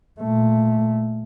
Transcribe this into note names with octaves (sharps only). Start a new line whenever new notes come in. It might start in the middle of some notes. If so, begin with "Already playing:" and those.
A#2 A3